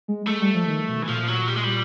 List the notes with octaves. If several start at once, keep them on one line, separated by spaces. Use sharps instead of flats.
G#3
G#3 A3
G3
F3
D#3
B2
E3
A#2 F3
F#3
G3
G#3
G3